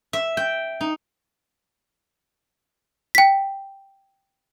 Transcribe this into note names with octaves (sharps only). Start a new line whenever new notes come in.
E5
G5
D#4
G5 B6